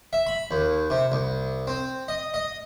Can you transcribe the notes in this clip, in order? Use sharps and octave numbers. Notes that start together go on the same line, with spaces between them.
E5
B5
D#2
C3
C2
C4
D#5
D#5